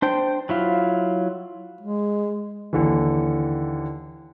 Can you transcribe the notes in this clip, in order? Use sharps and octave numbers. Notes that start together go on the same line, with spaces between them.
D4 C5 G5
F#3 E4 F4
G#3
D#2 D3 E3